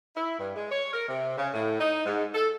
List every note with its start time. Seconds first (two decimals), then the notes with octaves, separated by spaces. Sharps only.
0.16 E4
0.39 G2
0.56 G#3
0.71 C#5
0.93 A#4
1.08 C3
1.37 C#3
1.53 A2
1.80 D#4
2.05 G#2
2.35 A4